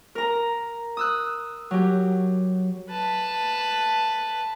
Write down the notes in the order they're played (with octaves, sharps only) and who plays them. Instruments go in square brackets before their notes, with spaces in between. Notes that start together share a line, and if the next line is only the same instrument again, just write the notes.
[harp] A#4 A#5
D#6 E6 F#6
F#3 G4
[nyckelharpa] B4 A5